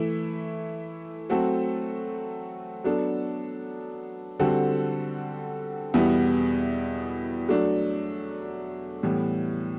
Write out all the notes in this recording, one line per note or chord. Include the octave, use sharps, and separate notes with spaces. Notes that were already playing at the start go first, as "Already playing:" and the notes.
Already playing: E3 A3 E4
F#3 A3 C4 F#4 A4
F#3 B3 D4 A4
D3 G3 C4 F#4 A4
E2 B2 G3 B3 E4
F#3 A3 D4
A2 E3 G3 B3